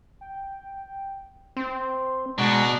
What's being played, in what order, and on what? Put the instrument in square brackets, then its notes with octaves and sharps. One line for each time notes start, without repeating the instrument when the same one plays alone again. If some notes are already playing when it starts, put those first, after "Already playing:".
[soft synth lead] G5
[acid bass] C4 [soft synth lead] C6
[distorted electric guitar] B2 [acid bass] G#3 [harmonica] D4 F#4 [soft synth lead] A#5